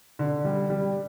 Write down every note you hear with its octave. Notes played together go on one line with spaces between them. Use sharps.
D3
G3
G3